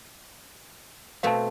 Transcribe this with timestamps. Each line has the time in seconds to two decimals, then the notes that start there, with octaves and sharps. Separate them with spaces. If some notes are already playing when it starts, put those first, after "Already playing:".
1.23 B2 A3 C4 F5 A5